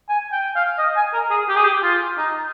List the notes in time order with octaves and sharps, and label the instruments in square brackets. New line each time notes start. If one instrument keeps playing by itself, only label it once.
[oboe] G#5
G5
F5
D#5
G#5
A#4
G#4
G4
G#4
G4
F4
D#4